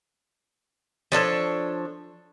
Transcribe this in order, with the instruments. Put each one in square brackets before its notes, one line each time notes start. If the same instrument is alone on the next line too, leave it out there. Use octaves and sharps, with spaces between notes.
[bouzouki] F3 D4 A4 C#5